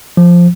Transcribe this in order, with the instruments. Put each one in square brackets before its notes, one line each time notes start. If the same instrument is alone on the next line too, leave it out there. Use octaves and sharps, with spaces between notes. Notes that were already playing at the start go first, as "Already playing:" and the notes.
[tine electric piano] F3